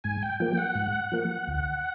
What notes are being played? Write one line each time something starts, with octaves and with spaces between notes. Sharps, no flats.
G#2 G#5
G5
F3 A#3 G5
F#5
G#2
F3 A#3
D2